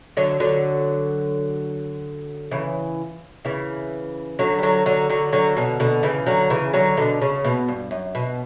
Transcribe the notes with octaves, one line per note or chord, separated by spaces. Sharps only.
D3 F#3
D3 F#3
C#3 E3
C#3 E3
D3 F#3
G3
D3 F#3
D3 F#3
D3 F#3
D3 F#3
B2 D3
B2 D3
C#3 E3
D3 F#3
C#3 E3
D3 F#3
B2 D3
C#3
B2
G2
F#2
B2